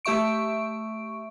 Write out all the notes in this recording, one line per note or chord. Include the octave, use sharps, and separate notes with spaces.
A3 G4 E5 C#6 D7